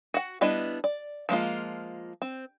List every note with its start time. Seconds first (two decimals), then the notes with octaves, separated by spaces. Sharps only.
0.14 F#4 F#5
0.41 G3 B3 D4 E4 D#5
0.84 D5
1.29 F3 G#3 A#3 F4
2.22 C4